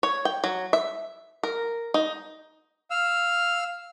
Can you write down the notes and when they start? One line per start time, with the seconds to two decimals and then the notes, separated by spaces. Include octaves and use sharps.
0.03 C#5
0.25 G5
0.44 F#3
0.73 E5
1.43 A#4
1.94 D#4
2.91 F5 E6 F6